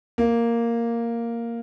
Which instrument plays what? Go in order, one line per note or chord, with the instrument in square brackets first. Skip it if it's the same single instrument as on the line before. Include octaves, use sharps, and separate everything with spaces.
[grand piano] A#3